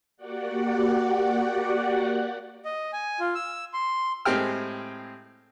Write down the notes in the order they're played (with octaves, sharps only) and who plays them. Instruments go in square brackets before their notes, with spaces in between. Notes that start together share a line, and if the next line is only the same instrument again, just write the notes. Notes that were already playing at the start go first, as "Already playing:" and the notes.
[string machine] A#3 F#4 G4 D5 F#5
[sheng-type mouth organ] D#5
G#5
F4
E6
C6
[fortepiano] A2 G#3 C4 G4 G5 F6